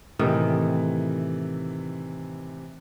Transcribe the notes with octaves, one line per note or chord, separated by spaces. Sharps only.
A2 C3 D#3 E3